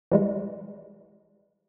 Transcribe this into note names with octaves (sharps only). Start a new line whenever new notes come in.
E3 G3 G#3